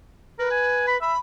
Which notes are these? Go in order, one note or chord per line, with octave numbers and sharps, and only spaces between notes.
A#4 B4
G#5
B5
E5 B5